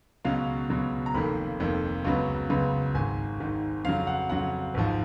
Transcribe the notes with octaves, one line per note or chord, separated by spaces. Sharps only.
C#2 B2 F#3 C#4 F5
C#2 B2 F#3 C#4
A#5
F1 F2 D#3 A#3 B5
F1 F2 D#3 A#3
C#2 C#3 F#3 B3
C#2 C#3 F#3 B3
G#1 G#2 D#3 G#5
G#1 G#2 D#3
F2 C#3 F#3 F5
F#5
F2 C#3 F#3 F#5
G#1 G#2 F3